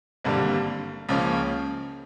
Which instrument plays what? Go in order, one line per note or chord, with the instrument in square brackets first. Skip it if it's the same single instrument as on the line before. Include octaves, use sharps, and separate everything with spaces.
[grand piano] G#1 G2 D3 G3 A#3
C#2 C#3 F3 A#3 C#4